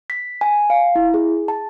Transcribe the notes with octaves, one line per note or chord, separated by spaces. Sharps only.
B6
G#5
F5
E4
G#4
A5